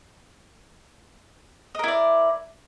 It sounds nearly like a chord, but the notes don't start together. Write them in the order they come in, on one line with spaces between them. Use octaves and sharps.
D#5 A#4 E4 D5